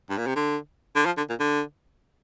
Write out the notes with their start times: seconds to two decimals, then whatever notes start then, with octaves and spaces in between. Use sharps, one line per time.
0.10 G2
0.18 A#2
0.27 C3
0.36 D3
0.96 D3
1.06 F3
1.18 D3
1.29 A#2
1.40 D3